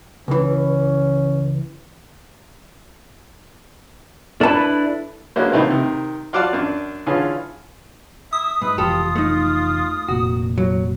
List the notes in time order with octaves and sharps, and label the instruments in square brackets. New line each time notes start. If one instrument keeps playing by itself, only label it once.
[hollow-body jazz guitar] C#2 E3 [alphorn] C#4
[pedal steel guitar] D4 E4 B4 [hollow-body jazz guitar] A4 A5
[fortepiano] G#3 A#3 C#4 D4 E4 F#4
D#3 E3 A3 A#3 C4
C3 D#3
F4 F#4 D5 F5 F#5 A5
F#2 D4
D3 E3 C#4 F4 G#4
[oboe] E5 [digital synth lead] D#6
[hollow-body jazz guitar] G#2 [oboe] B4
[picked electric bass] F1 E3 [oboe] F4 [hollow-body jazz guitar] G4 A4
[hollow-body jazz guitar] A3 D#4
[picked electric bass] F1 A#2 [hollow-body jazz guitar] F#4
[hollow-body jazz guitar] F#3